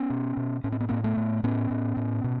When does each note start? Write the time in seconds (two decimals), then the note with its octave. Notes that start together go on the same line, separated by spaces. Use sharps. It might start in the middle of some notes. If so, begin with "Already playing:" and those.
Already playing: B3 C#4
0.10 B2
0.37 B2
0.64 A2 C#4
0.72 C4
0.80 B3
0.89 A2 A#3 C4
1.04 A3 B3
1.17 A2
1.44 A2 B3 C#4
1.71 A2
1.97 A2
2.24 B2